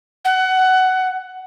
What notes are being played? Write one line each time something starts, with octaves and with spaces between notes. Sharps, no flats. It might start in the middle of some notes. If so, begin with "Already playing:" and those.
F#5